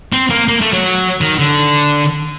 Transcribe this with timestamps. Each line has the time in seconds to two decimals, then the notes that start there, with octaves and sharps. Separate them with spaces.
0.13 C4
0.30 A#3
0.48 A#3
0.61 A3
0.73 F#3
1.21 D#3
1.39 D3